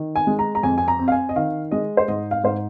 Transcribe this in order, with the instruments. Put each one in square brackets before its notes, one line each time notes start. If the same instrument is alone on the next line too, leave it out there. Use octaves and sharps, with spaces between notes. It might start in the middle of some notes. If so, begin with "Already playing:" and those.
Already playing: [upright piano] D#3
G#5
G#3
A#5
A#5
F2 G#5
G#5
A#5
C4
F5
G#5
D#5
D#3 F5
G#3 D#5
C5
G#2 D#5
F5
G#2 C5